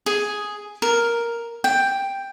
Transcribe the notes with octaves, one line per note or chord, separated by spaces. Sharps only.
G#4
A#4
G5